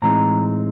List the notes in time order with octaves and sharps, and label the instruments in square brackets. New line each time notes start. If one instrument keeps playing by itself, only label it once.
[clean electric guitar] A2 E3 G#3 C4 D#4 A#5